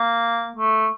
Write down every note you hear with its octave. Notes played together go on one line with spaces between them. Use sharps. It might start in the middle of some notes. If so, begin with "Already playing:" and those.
Already playing: A#3
A3